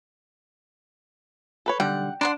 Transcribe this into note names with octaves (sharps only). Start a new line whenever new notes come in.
A4 B4 C#5
B1 D3 G3 F#5 G5
D4 F#5 A#5 C6